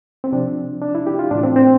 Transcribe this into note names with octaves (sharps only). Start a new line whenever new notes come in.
C4
C3 F3 D4
D4
E4
G4
F4
A2 E3 D4
C4
C4